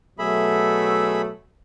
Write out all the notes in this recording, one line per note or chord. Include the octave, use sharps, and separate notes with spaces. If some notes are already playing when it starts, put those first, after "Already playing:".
B2 F#3 A3 G#4 E5 B5